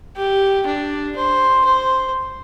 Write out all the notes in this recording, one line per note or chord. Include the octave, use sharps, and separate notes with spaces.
G4
D4
C5
C5